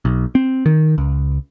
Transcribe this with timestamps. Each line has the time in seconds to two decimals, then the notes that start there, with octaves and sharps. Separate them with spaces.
0.05 B1
0.35 C4
0.66 D#3
0.98 C#2